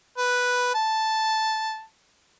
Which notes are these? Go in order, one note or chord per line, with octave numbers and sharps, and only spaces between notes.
B4
A5